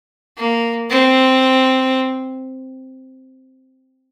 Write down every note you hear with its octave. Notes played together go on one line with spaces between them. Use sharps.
A#3
C4